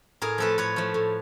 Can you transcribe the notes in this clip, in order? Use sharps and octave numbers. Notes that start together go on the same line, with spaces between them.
A2 G#4 A#4
F3 A3 A4 B4
A2 B4 C#5
F3 A3
A2